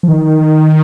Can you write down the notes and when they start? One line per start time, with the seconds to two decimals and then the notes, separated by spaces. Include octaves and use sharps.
0.03 F3
0.08 D#3